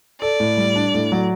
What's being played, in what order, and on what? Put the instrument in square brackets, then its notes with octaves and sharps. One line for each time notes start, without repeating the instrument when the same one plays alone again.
[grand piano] A4 [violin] D5
[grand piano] A2
G3
D4
A2
F#3